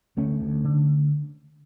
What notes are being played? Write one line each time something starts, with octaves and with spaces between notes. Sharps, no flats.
D2 A3 C#4
D2
D3